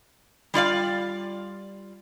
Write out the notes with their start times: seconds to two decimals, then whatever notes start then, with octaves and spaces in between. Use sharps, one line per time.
0.54 G3 F4 D5 F5